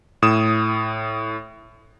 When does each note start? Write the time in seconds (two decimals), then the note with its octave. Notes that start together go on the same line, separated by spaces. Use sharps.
0.22 A2 D#6 E7